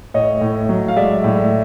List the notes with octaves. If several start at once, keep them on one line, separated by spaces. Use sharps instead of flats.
A2 C#5 D#5
A2
F#3
F5
G#3 D5 E5
A2